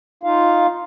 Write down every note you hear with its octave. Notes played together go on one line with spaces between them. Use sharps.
D#4 F4 F5